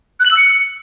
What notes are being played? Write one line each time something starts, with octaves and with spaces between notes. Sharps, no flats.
F#6
F#7
E6
C#7